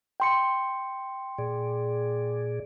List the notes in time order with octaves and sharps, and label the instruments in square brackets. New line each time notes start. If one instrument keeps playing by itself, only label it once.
[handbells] G5 C6 C#7
[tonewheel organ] A#2 G#4 D5